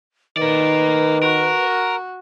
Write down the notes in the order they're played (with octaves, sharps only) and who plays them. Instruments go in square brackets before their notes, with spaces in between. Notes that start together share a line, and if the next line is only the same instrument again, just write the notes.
[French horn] D#3 [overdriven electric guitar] A#4 D5 [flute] B4
[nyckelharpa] F#4 [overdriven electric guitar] A#4